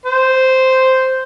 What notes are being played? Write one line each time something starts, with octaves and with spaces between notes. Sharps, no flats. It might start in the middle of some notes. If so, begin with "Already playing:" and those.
C5